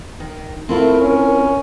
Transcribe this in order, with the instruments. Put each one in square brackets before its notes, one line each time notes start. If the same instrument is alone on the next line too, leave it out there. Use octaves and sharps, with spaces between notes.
[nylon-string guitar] D#3
[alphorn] A3 [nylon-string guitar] C4 E4 F4 [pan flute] A#4
[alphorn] C#4